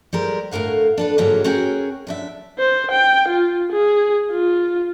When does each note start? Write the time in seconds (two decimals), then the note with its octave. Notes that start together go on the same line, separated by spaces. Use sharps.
0.13 G3 G#3 A#4 C5
0.51 D2 A2 A#4 F5 F#5
0.98 D4 A4 B4
1.18 G#2 D3 F#3 G#3 A#3 B3
1.44 C#4 F#4 G#4 A#4 G5
2.07 F#2 D4 E5
2.59 C5
2.91 G5
3.29 F4
3.72 G#4
4.32 F4